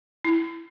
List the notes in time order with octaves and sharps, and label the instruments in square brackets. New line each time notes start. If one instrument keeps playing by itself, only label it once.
[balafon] E4